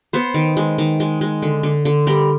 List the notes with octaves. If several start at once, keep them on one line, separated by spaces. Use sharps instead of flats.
B3 C5
D#3
G#3
D#3
G#3
G#3
D3
D3
D3
G3 A#4